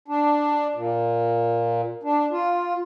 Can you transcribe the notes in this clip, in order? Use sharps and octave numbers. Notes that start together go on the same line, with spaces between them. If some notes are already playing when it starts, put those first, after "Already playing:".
D4
A#2
D4
F4